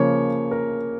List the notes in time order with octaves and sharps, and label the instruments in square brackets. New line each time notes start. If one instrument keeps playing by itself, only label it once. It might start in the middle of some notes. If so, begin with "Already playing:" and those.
Already playing: [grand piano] C#3 F3 A#3 C#5
A#4